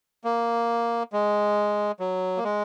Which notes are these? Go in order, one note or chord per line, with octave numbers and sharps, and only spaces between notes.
A#3
G#3
F#3
A#3
G#3